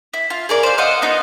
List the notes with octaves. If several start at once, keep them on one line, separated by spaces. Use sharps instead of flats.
E4
F4
G#4 A#4 D5
C5 F5
C5 D#5 F5 F#5
B3 D#4 F4